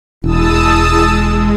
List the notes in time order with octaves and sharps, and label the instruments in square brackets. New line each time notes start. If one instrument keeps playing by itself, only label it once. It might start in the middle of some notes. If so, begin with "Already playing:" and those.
[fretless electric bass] E1 [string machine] G#3 [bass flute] E4 [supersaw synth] A5 D#6 E6